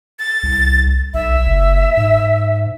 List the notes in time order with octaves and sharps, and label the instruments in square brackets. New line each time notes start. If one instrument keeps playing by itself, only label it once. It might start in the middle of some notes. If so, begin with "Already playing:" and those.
[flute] A6
[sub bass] C2
[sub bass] B1 [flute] E5
[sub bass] F#1
G#2